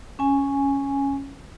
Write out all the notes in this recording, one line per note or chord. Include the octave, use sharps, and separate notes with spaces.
C#4 G#5